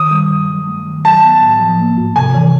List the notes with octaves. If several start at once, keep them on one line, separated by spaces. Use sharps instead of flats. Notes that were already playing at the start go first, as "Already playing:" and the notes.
Already playing: D#3 D#6
G3
G2
F#3
A3
D#3
F#3 A5
B3
A2
F3
A#3
G#2
C3 G#5
E3